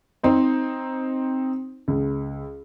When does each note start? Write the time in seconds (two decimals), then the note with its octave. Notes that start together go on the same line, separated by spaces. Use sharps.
0.23 C4 D#4 C5
1.88 C#2